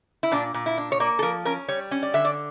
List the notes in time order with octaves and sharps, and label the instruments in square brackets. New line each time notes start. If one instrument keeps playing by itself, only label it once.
[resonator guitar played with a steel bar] E4
A#2 D4
A#2
E4
D4
C#5
A#3 D5
A4
F3 A#4
C#4 A#4
G3 C#5
C#4
D5
D3 E5
D5